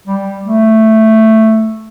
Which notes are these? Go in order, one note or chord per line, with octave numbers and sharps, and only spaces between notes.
G3
A3